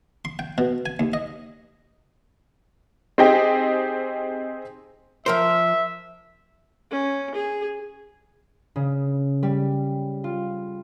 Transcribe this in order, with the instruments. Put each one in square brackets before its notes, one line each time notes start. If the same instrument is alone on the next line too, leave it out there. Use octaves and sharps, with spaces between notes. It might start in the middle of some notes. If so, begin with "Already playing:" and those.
[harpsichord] C6
G5
B2
G#5
D#2
D#5
[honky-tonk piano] C4 D#4 G4 G#4 D#5 G5
[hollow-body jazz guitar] F3 A#4 C5 [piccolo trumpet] E5
[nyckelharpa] C#4
G#4
[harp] C#3
G3
F4